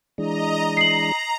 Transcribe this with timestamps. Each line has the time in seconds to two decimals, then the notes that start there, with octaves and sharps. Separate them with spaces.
0.18 E3 G#3 D4 D#5 A#5
0.77 A#5 C7 F#7